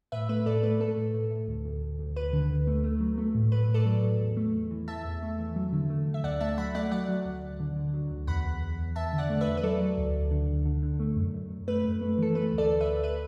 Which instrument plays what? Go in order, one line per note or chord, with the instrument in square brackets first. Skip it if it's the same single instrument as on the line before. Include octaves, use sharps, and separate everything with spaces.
[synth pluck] A2 B4 E5
A3 B4
A2 A4 D5
A3 B4
A3 A4
A2
A2
A2
D2
D2
D2
D2
D2 B4
D3
D2
A3
A3
F#3
A3
A2
A3 B4
A2
A4 D5
F#3
A2
E2
A3
E2
E3
E3 E5 A5
E2
A3
E3
F#3
D3
A3
D3
E5
D2 D5 F#5
A3 E5 A5
F#3 F#5 B5
A3 D5 F#5
F#3 D5 F#5
F#3
D2
D2
D3
D3
F#3
D2
E2 F#5 B5
E2
E2
E2
E2 E5 A5
D3
D5 F#5
A3
B4 E5
E2
B4
F#3 A4 D5
F#3
D2
D2
D3
D2
D3
D3
A3
F#2
F#2
F#2
A3 B4
F#2
A3
E3 A4
A3 B4
D2
A4 D5
D2
B4 E5
D2
B4